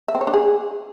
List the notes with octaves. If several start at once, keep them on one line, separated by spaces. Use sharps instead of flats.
E5
C4
C#5
D4
G#4